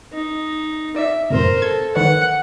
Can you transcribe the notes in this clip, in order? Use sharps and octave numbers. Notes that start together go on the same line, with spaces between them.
D#4
D5 E5
F#2 A2 C3 A#4 C5
A4 G#6
D#3 B4 C#5 F#5